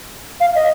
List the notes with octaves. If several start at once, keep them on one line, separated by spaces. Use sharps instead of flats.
F5
D#5